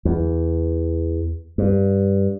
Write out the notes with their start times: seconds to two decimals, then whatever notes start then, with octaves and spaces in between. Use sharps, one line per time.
0.05 E2
1.58 G2